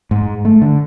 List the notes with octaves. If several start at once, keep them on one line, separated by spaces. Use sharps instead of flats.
G#2
A3
D3